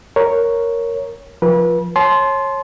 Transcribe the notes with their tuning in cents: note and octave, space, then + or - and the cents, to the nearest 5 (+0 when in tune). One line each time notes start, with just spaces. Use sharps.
A#4 +0 C#5 +0
F3 +0 B4 -35
C#5 -25 A5 -35 C6 +0